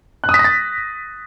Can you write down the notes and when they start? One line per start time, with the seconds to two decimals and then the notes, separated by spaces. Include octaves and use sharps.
0.24 F#6
0.29 D#6
0.34 B6
0.39 A#6
0.44 A6